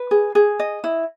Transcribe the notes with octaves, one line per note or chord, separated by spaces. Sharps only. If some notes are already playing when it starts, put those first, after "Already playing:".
Already playing: B4
G#4
G#4
D#5
E4